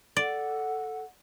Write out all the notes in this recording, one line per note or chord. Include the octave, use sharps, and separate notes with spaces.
A4 D5 F#5